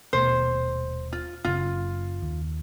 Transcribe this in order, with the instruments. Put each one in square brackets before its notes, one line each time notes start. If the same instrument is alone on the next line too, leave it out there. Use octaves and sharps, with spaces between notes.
[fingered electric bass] D#1 B2 A3 [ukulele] C5
[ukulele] F4
[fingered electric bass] F#1 C#3 [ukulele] F4
[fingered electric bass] D#2